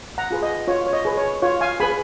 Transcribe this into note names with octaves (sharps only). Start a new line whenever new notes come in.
F#5 A#5
F4 G#4 B4
D#5
F4 C#5
C#5
D#5
G#4 B4
C#5
F4 C#5
F5 G#5
G#4 B4 G#5 B5